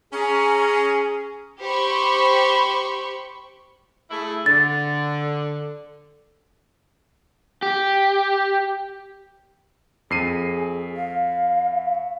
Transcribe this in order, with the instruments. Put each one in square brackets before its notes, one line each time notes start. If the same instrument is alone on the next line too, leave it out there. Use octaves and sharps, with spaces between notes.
[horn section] C#4 A#5 [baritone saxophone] G#4
[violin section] G4 C5 B5 C#6
[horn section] A3 E4 G#4
[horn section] D3 [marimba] A6
[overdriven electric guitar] G4
[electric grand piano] F2 C7 D#7 [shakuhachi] G#4
[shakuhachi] F5